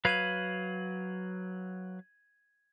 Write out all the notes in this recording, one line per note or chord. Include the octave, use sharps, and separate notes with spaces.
F#3 B4 F5 G#6 D#7 F#7